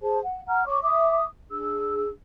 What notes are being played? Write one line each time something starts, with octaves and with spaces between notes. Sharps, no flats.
G#4 C5 A5
F#5
F#5 A#5 F6
C#5 C#6 D6
E5 D6 D#6
D4 G#4 E6